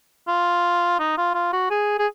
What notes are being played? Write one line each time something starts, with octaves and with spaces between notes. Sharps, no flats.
F4
D#4
F4
F4
F#4
G#4
G#4